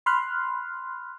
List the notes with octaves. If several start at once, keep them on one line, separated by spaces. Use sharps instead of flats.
B5 C6 F6 F#6